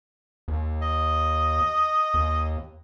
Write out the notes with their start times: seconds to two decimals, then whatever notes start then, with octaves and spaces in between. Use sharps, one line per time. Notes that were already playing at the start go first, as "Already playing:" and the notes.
0.48 D#2
0.82 D#5
2.14 D#2